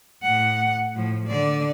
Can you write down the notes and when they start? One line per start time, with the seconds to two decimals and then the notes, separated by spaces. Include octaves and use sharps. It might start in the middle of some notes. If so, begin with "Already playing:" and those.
0.22 A2 F#5
0.95 A2 F3
1.28 D3 D5